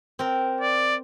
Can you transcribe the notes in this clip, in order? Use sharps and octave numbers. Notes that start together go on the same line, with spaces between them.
C4 A#4
D5